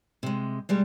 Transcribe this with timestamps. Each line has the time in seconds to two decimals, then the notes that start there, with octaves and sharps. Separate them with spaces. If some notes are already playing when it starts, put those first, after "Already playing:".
0.23 C3 G#3
0.69 B2 G3 G#3